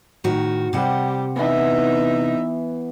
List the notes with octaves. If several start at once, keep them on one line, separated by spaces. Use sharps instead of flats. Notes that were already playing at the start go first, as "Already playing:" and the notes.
A2 D#3 F#4
C3 G3 G4 F#5
E3 B3 D#4 E5